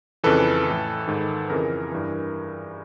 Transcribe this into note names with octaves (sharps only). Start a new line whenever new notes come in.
F2 C#3 E3 A4 B4
A2 E3
G#2 D#3
F2 C#3 E3 G#4 A#4
G2 E3